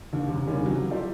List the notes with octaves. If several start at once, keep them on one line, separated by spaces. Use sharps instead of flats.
D#2 D3
F#2 C3
D#2 C3 D#3 G3 C#4
C3 E3 F#3
F4 G4 A4 D5